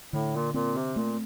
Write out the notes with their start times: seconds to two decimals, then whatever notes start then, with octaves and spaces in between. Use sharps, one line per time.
0.13 A2 D3
0.34 A#2
0.54 A#2 C4
0.75 C3
0.95 A#2 A3